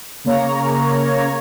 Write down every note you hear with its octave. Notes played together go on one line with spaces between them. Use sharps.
C#3 A#3 C#5 A#5